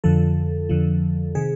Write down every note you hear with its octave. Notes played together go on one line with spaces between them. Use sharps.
F2 D3 F3 A4
F2 D3 F3
C3 D#3 G#4